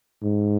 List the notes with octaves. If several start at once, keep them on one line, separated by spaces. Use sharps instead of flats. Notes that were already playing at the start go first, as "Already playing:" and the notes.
G#2